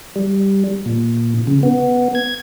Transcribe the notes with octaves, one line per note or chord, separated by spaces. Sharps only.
G3
A#2
C#3
B3
G#6